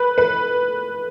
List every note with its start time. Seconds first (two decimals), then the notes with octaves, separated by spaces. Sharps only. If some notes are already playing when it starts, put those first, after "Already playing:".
Already playing: B4
0.18 B4